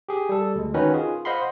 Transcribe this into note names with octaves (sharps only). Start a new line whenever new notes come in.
G4 G#4
G3 A4
D2 G#3
D#3 C#4 D#4 F#4 B4
F4 G#4
C5 D#5 F5 F#5 B5 C6